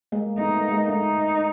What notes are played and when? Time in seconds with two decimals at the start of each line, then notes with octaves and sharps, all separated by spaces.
0.12 G#3 A#3
0.38 A3 B3 D#4
0.47 A#3
0.54 A3 B3
0.71 G#3 A#3
0.88 A3 D#4